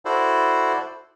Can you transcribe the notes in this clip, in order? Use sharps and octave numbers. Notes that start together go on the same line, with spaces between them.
E4 F#4 A4 C5 D5